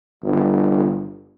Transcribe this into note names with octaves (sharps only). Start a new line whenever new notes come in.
G1